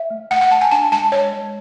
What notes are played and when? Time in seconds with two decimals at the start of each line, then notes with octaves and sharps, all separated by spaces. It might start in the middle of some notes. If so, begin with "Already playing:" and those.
Already playing: E5
0.10 A3
0.31 A3 F#5
0.41 F#5
0.51 A3 A5
0.61 G#5
0.71 D4 A5
0.92 G#3 A5
1.12 G#3 C#5
1.33 G#3